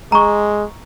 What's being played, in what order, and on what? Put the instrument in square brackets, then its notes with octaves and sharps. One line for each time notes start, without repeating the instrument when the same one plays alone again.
[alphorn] G#3 [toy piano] A#5 C#6